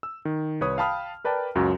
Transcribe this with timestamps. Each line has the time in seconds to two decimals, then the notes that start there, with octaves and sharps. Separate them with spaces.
0.03 E6
0.25 D#3
0.61 C2 B4 C#5 D#6
0.78 F5 G5 A5 B5 D#6 F6
1.24 A#4 B4 D5 G5 A5
1.55 C#2 F#2 F#3 F#4